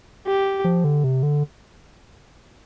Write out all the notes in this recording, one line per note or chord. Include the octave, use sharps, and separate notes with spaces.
G4
F3
D3
C3
D3